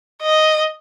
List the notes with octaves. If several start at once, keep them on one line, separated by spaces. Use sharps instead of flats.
D#5